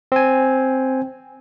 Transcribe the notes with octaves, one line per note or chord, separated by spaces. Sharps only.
C4 G#5